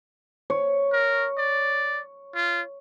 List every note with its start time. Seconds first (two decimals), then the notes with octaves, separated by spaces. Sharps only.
0.50 C#5
0.93 A#4
1.38 D5
2.35 F4